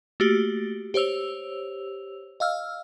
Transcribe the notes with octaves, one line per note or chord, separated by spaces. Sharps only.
A3 A#3 F#4 G4
G4 C5 C#5 E6 F7
D#5 F5 E6 F6